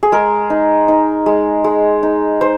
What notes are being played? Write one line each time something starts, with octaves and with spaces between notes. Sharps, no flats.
G#4
G#3 A#4
D#4
D#4
G#3
G#3
D#4
D#4 C5